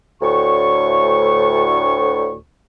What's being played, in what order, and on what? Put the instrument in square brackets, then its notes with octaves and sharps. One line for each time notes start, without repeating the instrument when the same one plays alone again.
[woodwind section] D2 A2 C#6